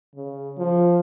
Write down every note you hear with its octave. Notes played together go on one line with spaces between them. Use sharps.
C#3
F3